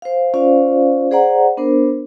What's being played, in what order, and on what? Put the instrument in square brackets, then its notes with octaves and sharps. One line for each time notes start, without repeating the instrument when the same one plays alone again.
[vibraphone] C5 F5
C#4 F4 C5 D5 F5
G#4 C5 D5 F#5 A#5
B3 D4 A#4 C5